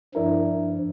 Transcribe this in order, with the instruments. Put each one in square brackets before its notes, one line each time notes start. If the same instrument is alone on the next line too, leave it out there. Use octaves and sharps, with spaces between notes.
[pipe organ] G2 F3 [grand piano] D4 E4 A#4